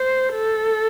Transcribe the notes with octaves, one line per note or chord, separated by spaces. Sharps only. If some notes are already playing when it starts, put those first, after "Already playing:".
Already playing: C5
A4